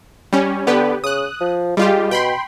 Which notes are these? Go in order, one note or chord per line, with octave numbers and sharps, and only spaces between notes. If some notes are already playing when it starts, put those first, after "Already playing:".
G3 C#4
D3 B3 G4 B4
C#3 D#6 F#6
F3
G3 G#3 F4 G4
B2 G5 B5 C6